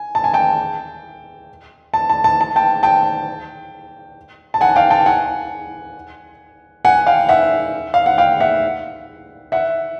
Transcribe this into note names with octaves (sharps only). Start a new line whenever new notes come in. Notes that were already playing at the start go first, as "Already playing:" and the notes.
Already playing: G#5
A5
G#5
G5 A5
A5
A5
A5
A5
G5 A5
G5 A5
A5
F#5 G#5
F5 G5
G5 A5
F#5 G#5
F#5 G#5
F5 G5
E5 F#5
F5
F#5
F5 G5
E5 F#5
E5 F#5